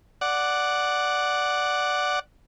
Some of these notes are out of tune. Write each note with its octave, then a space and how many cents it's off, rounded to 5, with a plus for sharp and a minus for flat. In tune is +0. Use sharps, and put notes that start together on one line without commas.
D5 +0 F#5 +0